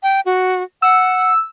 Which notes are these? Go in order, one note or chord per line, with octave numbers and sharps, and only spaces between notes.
G5
F#4
F#5 E6